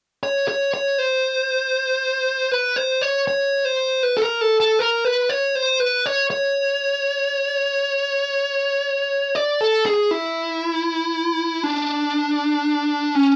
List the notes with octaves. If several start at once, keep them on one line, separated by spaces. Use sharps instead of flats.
C#5
C#5
C#5
C5
B4
C5
C#5
C#5
C5
B4
A4
A#4
A4
A4
A#4
B4
C#5
C5
B4
C#5
C#5
D5
A4
G#4
E4
D4
C#4